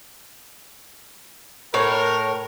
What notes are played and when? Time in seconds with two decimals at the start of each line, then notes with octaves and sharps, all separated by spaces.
1.74 A2 A#4 C#5